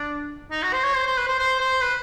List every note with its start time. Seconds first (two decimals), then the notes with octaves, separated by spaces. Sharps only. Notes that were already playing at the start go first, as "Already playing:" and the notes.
Already playing: D4
0.51 D#4
0.63 F#4
0.73 C5
0.84 C#5
0.95 C5
1.06 C5
1.17 B4
1.27 C5
1.39 C5
1.60 C5
1.82 B4